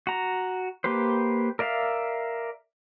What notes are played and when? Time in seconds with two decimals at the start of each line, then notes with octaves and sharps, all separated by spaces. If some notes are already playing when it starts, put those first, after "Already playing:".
0.07 F#4 A#5
0.84 A#3 G4 B4 C5
1.59 A#4 D5 E5 F5